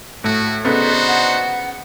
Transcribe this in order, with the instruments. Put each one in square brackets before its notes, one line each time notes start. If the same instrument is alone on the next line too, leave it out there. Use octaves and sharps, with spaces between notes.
[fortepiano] A2 [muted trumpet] F#4
[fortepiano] C#3 B3 [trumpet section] D4 D#4 C5 [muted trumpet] F#4 [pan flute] A4
[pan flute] F#5